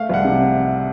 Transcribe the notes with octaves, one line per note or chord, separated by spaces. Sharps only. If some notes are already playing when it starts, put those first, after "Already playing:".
Already playing: A3 F5
C2 F#5
C3